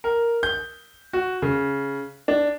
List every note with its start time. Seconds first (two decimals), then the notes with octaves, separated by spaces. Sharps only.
0.04 A#4
0.43 G6
1.13 F#4
1.42 C#3
2.28 D4